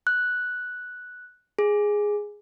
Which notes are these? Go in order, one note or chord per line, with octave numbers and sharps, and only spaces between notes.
F#6
G#4